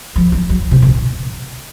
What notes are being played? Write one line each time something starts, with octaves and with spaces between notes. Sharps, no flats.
F3
F#3
F#3
C3
A#2